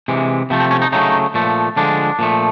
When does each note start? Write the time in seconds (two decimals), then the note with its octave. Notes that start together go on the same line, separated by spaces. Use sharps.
0.08 C3 E3 G#3
0.50 C3 F3 A3 B3
0.60 C4
0.71 C#4
0.82 D#4
0.92 C#3 F#3 A3 D#4
1.34 A#2 F3 A3
1.76 D3 F3 G#3 D4
2.19 A#2 F3 A3